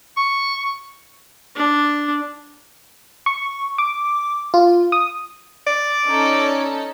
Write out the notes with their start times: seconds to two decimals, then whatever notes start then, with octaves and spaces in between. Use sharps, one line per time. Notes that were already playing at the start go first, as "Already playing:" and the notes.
0.17 C#6
1.56 D4
3.26 C#6
3.78 D6
4.54 F4
4.92 D#6
5.67 D5
6.07 C#4 D#4 A4